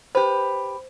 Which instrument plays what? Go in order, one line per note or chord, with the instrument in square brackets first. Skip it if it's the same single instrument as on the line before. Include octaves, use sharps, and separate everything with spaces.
[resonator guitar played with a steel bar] G4 B4 [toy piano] C5